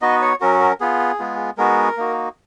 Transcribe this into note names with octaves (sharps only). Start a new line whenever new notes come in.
B3 D#4 F#4 D#5
C#5
F#3 C#4 F#4 A#4
A#4
B3 F4 G#4
G#3 B3 F4
G#3 B3 D#4 F#4 A#4
A#3 D#4 F#4